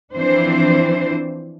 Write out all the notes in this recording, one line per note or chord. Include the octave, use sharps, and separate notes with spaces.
E3 F3 C4 D4 C5